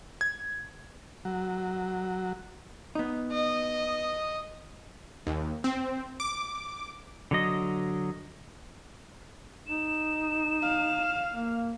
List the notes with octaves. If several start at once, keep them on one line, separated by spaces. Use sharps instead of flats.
G#6
F#3
B3 D#4
D#5
D#2
C4
D6
D3 F#3 D#5
D#4 E7
F5
A#3